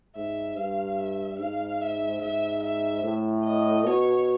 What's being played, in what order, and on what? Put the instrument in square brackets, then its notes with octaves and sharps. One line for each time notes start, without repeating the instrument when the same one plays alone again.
[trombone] G#2 [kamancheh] E5
[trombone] G2 [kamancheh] F5
[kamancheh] E5
[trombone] G#2 [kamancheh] F5
[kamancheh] E5
[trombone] G#2 [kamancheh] E5
[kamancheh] E5
[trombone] A2
[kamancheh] D#5
[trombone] B2 [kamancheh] C#5